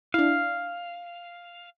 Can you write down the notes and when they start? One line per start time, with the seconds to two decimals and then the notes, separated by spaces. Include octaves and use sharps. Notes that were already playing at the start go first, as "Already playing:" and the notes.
0.14 D4 E4 F5